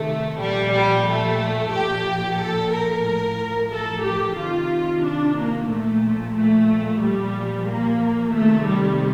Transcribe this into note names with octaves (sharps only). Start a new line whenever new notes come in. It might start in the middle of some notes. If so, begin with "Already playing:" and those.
Already playing: C3 D#3 A3
A#2 F3 G3
G3
A3
A#2 F3 G4
A4
A#4
A2 F3
A4
G4
C3 D#3 F4
D4
A#3
A#2 F3 A3
A3
A#2 F3 G3
A#3
C3 D#3 A3
G3